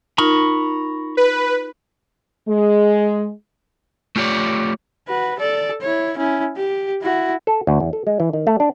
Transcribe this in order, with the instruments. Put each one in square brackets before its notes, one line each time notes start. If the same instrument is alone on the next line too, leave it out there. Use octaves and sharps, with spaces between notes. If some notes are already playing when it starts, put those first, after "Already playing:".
[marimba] D#4 F4 A#4 [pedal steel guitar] A#5 B5 C#6
[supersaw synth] B4
[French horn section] G#3
[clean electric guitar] A3 F4 G4 C#5 D5
[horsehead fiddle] F#4 B4
A4 D5
E4 C#5
C#4 E4
G4
E4 F#4
[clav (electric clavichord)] A4
D2
E2
A4
G#3
E3
D#3
A3
D4